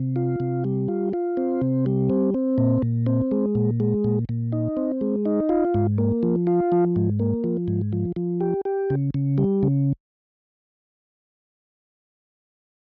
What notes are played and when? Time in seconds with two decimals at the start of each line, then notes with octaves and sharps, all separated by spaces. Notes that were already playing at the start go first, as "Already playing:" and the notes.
Already playing: C3
0.16 F4
0.40 C3
0.64 G3
0.88 F4
1.13 F4
1.37 C4
1.62 C3
1.86 G3
2.10 C4
2.34 C4
2.58 A#2
2.82 A#2
3.06 C4
3.31 G#3
3.55 A#2
3.80 G#3
4.04 A#2
4.29 A#2
4.52 D#4
4.77 C4
5.01 G#3
5.26 D#4
5.49 F4
5.74 G#2
5.98 A#3
6.23 F3
6.47 F4
6.72 F3
6.96 G#2
7.19 A#3
7.44 F3
7.68 G#2
7.93 F3
8.16 F3
8.41 G4
8.65 G4
8.90 C#3
9.14 C#3
9.38 G3
9.63 C#3